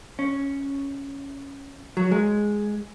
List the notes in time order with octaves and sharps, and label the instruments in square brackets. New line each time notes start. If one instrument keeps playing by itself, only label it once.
[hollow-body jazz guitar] C#4
F#3
G#3